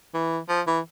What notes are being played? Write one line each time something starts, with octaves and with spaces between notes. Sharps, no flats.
E3
F3
E3